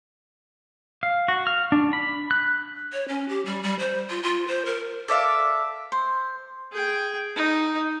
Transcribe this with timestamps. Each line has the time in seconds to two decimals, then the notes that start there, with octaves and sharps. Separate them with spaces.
1.03 F5
1.28 F#4
1.47 F6
1.72 D4
1.93 B5
2.31 F#6
2.93 C#5
3.08 C#4
3.29 G4
3.46 G3
3.63 G3
3.79 C5
4.10 F4
4.23 F4
4.48 C5
4.66 A#4
5.08 A4 D5 E5 F5
5.92 C5
6.72 G#4 G5
7.36 D#4